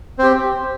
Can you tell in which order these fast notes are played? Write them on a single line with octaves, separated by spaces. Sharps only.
C4 C5 G4